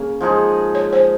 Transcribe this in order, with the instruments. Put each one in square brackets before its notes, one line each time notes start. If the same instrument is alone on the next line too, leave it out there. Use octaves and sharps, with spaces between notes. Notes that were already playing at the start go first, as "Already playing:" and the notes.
Already playing: [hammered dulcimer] C#3 A#3 C#4
F3 G#3 D#4 G#4
[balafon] C#5
C5